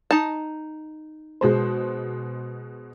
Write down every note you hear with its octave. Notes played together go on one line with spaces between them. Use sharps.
D#4 A5
B2 G#3 C5